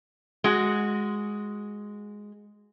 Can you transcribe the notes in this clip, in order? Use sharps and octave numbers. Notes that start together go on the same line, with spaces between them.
G#3 F#4